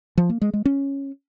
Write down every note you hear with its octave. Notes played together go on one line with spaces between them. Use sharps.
F3
A#3
G#3
G#3
C#4